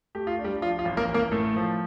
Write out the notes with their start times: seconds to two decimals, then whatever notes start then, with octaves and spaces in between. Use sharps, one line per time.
0.15 A3 G4
0.27 F4
0.39 D4
0.44 G3 G4
0.61 F3 F4
0.79 F4
0.85 A1
0.97 A#3 A#4
1.09 A1
1.14 A#3 A#4
1.32 A2 A3 A4
1.56 F3